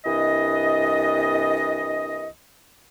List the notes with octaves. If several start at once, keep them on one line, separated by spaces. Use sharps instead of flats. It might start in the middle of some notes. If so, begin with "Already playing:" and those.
C2 E3 D4 D#5